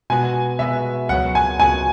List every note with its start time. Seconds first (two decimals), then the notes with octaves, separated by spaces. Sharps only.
0.10 B2 G#3 B3 F#4 G#5
0.59 B2 G#3 B3 F#4 E5
1.09 C#2 C#3 F#3 B3 F#4 F#5
1.35 G#5
1.60 C#2 C#3 F#3 B3 F#4 G#5